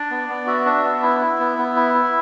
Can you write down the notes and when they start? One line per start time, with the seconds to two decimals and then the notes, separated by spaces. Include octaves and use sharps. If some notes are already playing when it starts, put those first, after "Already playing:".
Already playing: D4 D5
0.11 B3
0.29 B3
0.47 F#4 E5
0.65 D4
0.84 B3
1.03 E4
1.21 E4
1.40 B3
1.58 B3
1.76 E4
1.94 E4